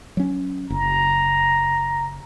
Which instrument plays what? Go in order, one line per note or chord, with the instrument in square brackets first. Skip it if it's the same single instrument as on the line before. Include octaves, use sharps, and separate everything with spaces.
[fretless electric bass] F#3 C#4
[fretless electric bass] F#1 [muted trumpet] A#5